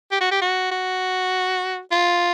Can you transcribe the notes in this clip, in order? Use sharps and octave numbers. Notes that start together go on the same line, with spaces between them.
G4
F#4
G4
F#4
F#4
F4